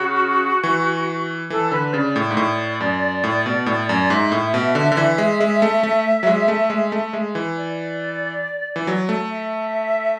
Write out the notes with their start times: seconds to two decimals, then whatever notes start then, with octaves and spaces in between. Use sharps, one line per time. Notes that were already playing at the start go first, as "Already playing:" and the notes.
Already playing: C#3 F#4
0.63 E3
1.50 E3 A4
1.71 D3 B4
1.93 C#3 D5
2.16 A2 D5
2.31 G#2
2.37 A2
2.80 F#2
3.24 A2
3.46 B2
3.66 A2
3.89 F#2
3.98 D5
4.10 G#2 E5
4.32 A2
4.54 B2
4.75 D3
4.92 D3
4.97 E3
5.18 G#3
5.40 G#3
5.62 A3
5.83 A3
6.23 F#3
6.27 G#3
6.48 A3
6.70 G#3
6.92 A3
7.13 G#3
7.35 E3
7.57 D5
8.76 E3
8.87 F#3
9.09 A3
9.30 E5